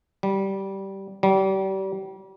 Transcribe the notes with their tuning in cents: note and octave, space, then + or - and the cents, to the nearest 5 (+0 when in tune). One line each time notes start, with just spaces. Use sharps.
G3 -15
G3 -35